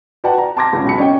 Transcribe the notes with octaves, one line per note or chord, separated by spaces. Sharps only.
F#4 B4 D5 F#5 G5 A5
A#5
A5 C6 D6 G#6 A#6
C#2 C#4 C#6
B1 B5 C#7
C#4 D4 D#5 G5